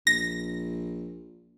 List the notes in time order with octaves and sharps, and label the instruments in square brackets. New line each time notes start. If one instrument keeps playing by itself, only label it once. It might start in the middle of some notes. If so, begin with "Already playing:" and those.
[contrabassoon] A#1 [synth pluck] A#6